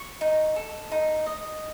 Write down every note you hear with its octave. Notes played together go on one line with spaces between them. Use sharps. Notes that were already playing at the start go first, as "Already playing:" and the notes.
Already playing: C#6
D#4
A4
D#4
D#5